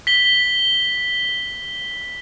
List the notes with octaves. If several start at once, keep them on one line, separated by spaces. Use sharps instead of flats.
B6 G7